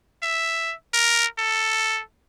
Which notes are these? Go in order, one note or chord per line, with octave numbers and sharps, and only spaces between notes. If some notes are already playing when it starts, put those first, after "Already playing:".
E5
A#4
A4